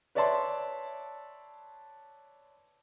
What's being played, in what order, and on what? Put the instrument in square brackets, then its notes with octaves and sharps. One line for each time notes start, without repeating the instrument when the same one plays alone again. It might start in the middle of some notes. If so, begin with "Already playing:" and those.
[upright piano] B4 C#5 D5 E5 A5 C6